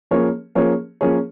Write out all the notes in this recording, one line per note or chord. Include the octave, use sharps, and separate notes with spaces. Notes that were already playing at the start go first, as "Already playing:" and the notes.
F3 A#3 C#4 G#4 C#5
F3 A#3 C#4 G#4 C#5
F3 A#3 C#4 G#4 C#5